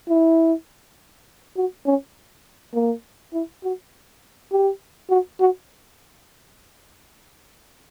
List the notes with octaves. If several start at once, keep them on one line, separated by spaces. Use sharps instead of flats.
E4
F#4
C#4
A#3
E4
F#4
G4
F#4
F#4